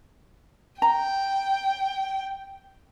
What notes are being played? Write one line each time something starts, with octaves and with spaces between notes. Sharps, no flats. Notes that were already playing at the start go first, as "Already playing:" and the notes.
G5 A#5